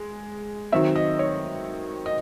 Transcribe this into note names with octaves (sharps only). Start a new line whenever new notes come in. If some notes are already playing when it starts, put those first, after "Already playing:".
Already playing: G#3
D#3 F#3 C4 E5
D#5
C#5
D#5